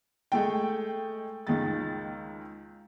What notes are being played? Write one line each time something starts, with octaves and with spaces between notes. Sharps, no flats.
G#3 A3 G5
C#2 D#3 G#3 A6